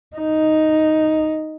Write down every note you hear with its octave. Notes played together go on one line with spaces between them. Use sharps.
D#4